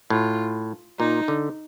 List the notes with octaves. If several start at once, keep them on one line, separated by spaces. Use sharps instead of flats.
A2 F4
A#2 D#4
D3